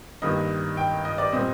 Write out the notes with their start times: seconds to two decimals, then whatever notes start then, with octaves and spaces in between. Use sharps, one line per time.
0.22 G2 D#3 A#3 D#5
0.77 G5
1.05 D#5
1.18 D5
1.32 A#2 G3 C4 D#5